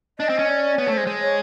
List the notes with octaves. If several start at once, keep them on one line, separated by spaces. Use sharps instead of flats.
D4 D#5
C4
C#4
D5
B3 C#5
A3
G#3 C5
G#3
C#5